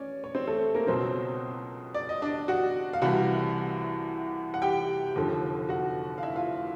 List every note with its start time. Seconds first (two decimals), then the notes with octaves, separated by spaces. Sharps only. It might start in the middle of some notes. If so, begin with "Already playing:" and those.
Already playing: C#4 C#5 D5
0.24 C#5
0.35 C4 C5
0.47 A3 A4
0.74 A#3 A#4
0.87 C#2 B2 F#3 C4 C5
1.94 D5
2.09 D#5
2.22 D4 D5
2.48 F#4 F#5
2.93 F5
3.02 C2 C3 E3 G3 F#4 F#5
4.54 F#5
4.62 G4 G5
5.16 F1 D#2 D3 F3
5.69 F#4 F#5
6.18 F5
6.23 E4 E5
6.36 F4 F5